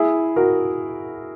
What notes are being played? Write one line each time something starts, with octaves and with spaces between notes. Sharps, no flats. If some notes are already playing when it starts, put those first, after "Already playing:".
Already playing: E4 G#4
F#4 A#4